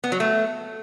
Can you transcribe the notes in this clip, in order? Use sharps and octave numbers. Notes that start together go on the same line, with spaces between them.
B3
F#3
A3